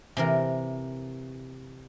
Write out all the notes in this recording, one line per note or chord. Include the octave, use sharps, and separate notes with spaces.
C3 E3 A#4